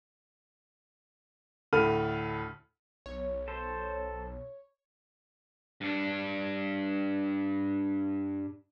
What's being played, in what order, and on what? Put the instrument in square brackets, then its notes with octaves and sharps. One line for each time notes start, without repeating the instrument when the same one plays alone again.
[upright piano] D2 A2 A4 B5 F6 D#7
[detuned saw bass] B1 [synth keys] C#5
[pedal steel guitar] A4 C5
[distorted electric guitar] G2 D4